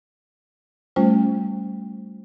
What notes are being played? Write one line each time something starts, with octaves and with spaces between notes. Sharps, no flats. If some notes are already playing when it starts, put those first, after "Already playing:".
G3 A3 C#4 F4 C5